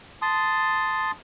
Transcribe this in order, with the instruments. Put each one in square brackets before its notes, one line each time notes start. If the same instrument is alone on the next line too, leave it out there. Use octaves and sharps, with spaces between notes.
[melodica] A5 C6 D#6